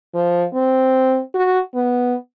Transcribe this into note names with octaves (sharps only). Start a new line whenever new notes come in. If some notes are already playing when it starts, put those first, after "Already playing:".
F3
C4
F#4
B3